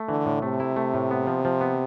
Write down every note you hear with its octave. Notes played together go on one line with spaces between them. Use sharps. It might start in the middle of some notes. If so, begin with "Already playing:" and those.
Already playing: A3
D3 E3
A2
C3 A3
E4
A3
A2
B3
F3
F3
B3